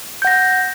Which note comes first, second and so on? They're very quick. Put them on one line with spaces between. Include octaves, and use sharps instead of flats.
G6 F#5 A#6